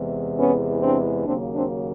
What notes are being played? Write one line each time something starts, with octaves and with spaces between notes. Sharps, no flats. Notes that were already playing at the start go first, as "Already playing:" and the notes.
Already playing: E2 C3 E3 G#3
B3 C#4
C4 D4
D#2 C#3 F#3 A#3 C4 D4
C4 D4